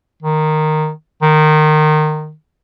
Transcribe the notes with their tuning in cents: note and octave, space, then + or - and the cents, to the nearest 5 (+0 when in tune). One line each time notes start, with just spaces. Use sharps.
D#3 -10
D#3 -20